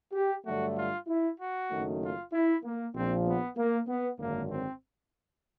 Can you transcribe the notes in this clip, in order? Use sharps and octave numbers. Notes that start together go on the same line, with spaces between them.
G4
G2 D3 F#3 A3 F#4
F4
E4
F#4
F#1 F#2 D#3 F#3 A3
F4
E4
A#3
A#1 A#2 F3 C4
B3
A#3
B3
G#1 F#2 D3 A#3
C4